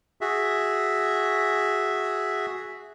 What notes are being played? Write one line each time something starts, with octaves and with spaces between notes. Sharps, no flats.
F#4 G#4 E5